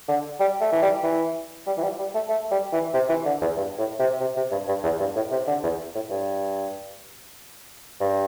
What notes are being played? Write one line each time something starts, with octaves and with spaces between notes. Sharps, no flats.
D3
G3
A3
E3
G3
E3
G3
E3
G3
G3
A3
A3
G3
E3
C3
E3
D3
E2
G2
A2
C3
C3
C3
G2
G2
E2
G2
A2
C3
D3
E2
A2
G2
G2